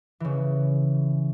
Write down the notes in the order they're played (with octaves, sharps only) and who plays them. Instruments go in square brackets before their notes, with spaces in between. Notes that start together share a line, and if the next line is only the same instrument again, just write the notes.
[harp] C#3 E3